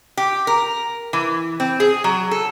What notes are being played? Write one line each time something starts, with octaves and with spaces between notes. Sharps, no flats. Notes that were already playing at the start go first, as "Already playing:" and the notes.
G4
A#4
E3
C4
G#4
F#3
A4